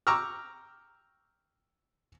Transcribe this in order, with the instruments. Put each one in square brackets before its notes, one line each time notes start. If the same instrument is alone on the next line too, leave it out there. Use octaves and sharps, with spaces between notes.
[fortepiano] G5 A#5 C#6 D6 E6 F6